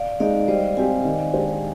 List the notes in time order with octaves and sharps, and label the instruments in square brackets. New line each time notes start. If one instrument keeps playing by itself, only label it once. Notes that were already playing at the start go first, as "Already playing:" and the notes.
Already playing: [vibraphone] D5 F5
[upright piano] G#3 D#4 [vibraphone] D5 F5
[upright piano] G3 [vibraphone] C5 D#5
[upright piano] C4 G4 [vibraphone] F5 G#5
[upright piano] D#3
G#3 D4 G4 C5